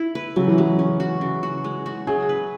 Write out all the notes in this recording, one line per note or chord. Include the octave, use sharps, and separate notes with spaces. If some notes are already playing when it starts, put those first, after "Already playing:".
Already playing: E4
B4
C#3 F#3
E3
F#3 G#3
C#4
F#4
C#3
F#4
G#3
F#4
F#3 G#4
B4